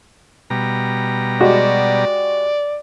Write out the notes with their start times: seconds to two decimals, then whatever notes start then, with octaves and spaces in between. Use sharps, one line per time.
0.50 B2 G3 A#5
1.40 G#3 F#4 G4 D5